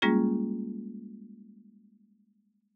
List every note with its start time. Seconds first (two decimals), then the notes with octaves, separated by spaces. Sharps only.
0.02 G3 G#3 A#3 C#4 F4 G#4